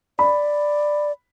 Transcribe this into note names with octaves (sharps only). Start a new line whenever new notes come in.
D5 B5